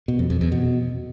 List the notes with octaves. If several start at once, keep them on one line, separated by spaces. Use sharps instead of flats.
B2
F2
F2
E2
B2